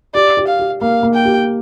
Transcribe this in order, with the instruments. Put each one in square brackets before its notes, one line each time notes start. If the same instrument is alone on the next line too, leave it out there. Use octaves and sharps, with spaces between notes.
[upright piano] G4 [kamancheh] D5
[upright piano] G4
[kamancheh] F5
[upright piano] G4
[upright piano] A#3 [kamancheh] F5
[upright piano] A#3
[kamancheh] G5
[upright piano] G4